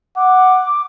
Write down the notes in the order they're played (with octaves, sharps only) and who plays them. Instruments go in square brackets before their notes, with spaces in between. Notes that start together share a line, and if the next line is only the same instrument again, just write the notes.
[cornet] F#5 [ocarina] D6